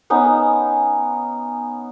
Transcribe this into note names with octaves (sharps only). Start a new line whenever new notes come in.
B3 C#4 D#4